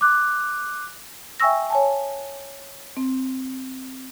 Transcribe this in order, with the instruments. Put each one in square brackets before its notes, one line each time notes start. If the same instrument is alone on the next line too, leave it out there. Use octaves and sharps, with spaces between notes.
[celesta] D6 F#6
[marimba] E5 G5 G#5 C#6 E6 A#6
C#5 G#5 A5
C4